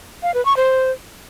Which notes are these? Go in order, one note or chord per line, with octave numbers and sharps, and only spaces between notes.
F5
B4
C#6
C5